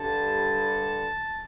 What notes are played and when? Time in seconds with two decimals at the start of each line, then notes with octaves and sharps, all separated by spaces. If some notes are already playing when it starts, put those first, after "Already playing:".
Already playing: G2 D3 G3 A5